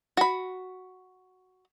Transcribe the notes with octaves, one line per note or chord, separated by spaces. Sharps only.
F#4 B5